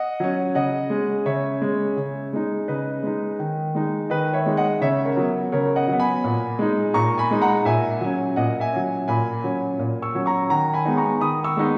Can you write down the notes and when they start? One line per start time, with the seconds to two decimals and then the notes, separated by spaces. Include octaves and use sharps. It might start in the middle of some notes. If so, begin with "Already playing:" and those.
Already playing: D#5 F#5
0.20 F#3 C#4
0.55 C#3 D#5 F#5
0.90 G#3 C#4
1.26 C#3 C#5 E5
1.62 G#3 C#4
1.97 C#3
2.33 G#3 D#4
2.68 C#3 B4 D#5
3.03 G#3 D#4
3.39 D#3
3.75 G#3 D#4
4.10 D#3 B4 D#5
4.33 C#5 E5
4.46 G#3 D#4
4.57 D#5 F#5
4.81 C#3 C#5 E5
5.05 A#4 C#5
5.17 F#3 B3
5.52 C#3 A#4 C#5
5.76 D#5 F#5
5.88 F#3 B3
6.00 G#5 B5
6.24 A#2
6.59 G#3 D#4
6.94 A#2 A#5 C#6
7.18 G#5 B5
7.31 G#3 D#4
7.41 F#5 A#5
7.65 A#2 E5 G#5
8.01 F#3 C#4
8.36 A#2 D#5 F#5
8.60 E5 G#5
8.72 F#3 C#4
9.08 A#2 G#5 B5
9.44 F#3 C#4
9.79 A#2
10.02 C#6 E6
10.15 F#3 C#4
10.26 A#5 C#6
10.50 D#3 F#5 A#5
10.73 G#5 B5
10.85 G#3 B3 D#4
10.97 A#5 C#6
11.21 D#3 B5 D#6
11.44 C#6 E6
11.57 G#3 B3 D#4